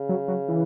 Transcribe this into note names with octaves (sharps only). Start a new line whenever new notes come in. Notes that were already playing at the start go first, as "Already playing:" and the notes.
Already playing: C#3
F#3
F#3
E3